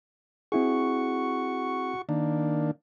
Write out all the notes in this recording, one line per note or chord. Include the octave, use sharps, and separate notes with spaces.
C4 E4 F#4 G#4 C#6
D#3 A#3 D4